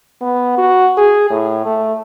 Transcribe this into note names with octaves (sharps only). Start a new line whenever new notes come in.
B3
F#4
G#4
A2
A3